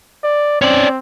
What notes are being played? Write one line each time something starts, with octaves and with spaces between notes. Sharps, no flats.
D5
C4 C#4 D5